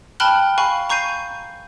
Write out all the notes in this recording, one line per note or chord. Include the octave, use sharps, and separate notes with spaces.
G5 A5 B5 F6 F#6 G7
F5 G#5 B5 C#6
A#5 C#6 G6 C7 D#7